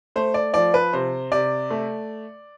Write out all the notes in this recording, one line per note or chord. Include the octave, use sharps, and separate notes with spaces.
A3 C5
D5
F3 D5
B4
C3 C5
C3 D5
A3